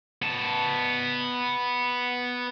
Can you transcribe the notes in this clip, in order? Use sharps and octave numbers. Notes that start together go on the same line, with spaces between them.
B3 A5